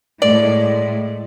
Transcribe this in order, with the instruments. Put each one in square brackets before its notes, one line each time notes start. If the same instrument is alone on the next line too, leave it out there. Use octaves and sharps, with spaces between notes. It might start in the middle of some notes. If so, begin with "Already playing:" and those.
[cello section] A2 G#3 [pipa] D5